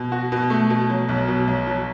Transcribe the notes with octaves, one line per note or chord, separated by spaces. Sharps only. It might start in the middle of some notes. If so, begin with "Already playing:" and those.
Already playing: B2
F#4
B2
A3
B2
F#3
B1
B2
B1
F#3